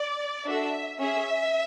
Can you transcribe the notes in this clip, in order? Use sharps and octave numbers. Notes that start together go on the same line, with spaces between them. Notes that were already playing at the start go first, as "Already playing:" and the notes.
Already playing: D5
D4 F#4 A4 E5
C#4 G#4 E5